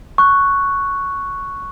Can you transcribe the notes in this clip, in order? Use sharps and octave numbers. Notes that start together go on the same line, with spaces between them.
C#6 F#6